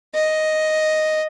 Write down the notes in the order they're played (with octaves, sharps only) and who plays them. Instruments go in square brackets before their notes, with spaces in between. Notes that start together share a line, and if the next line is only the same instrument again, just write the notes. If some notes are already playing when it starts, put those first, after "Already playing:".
[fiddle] D#5